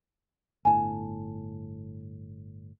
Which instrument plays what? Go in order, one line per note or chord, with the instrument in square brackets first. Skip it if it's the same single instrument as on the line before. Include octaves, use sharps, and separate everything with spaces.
[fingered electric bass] G1 A2 [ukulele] G#5 A5